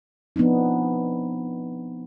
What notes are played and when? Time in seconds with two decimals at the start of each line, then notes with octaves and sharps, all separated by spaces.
0.36 F3 B3 C4 D4 D#4